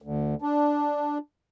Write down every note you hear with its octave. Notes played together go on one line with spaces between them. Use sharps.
D2
D4